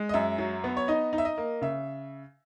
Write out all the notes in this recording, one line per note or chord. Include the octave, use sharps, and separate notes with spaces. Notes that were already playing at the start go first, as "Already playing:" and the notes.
Already playing: G#3
D#5
F#2 E5
F#3
B3
C#5
D#4 D#5
D#4
E5
D#5
A#3
C#3 E5